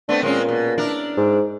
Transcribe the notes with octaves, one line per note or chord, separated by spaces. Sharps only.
A3 B3 C4 D4
A#2 G#3 C4 C#4
B2
D4 E4 A#4
G#2